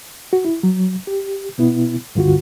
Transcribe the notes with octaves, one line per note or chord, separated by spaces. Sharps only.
F#4
E4
F#3
G4
B2 B3 E4
C#2 G2 D3 F4 F#4